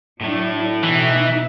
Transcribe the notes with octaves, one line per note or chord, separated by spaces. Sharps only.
A2 F#3 A3 D4 E4
B2 E3 D#4 E5